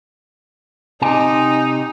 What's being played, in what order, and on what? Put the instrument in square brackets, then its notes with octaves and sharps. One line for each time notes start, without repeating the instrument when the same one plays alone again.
[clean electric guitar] C3 G5 G#5 [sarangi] D#4